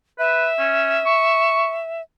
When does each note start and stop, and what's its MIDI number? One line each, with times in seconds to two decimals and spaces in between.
0.19 0.47 71
0.19 2.02 76
0.59 0.97 61
1.06 1.75 85